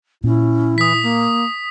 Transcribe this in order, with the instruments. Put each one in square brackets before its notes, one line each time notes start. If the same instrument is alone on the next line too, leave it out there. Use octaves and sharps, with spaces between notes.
[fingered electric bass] A#2 [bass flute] C#4 [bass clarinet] E4
[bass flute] E3 [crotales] D#6 B6
[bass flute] A#3